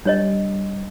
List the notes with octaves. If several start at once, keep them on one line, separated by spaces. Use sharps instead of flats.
G3 D4 C#5 D#5